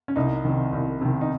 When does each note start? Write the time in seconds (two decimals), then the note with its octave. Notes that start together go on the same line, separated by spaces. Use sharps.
0.08 C#4
0.16 C2 D#4
0.45 C3 D#3
0.73 C2
1.01 C3 D#3
1.21 D#4